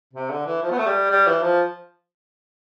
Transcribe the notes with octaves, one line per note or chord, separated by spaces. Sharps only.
C3
D3
E3
F3
B3
A3
G3
G3
E3
F3